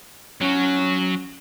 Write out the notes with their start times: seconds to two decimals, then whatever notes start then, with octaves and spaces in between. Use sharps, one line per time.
0.41 F#3 C#4 F#4